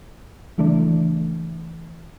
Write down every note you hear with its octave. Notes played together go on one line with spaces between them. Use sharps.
C#3 E3 A3 D4